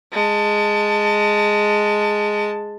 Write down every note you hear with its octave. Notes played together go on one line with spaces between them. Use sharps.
G#3 A5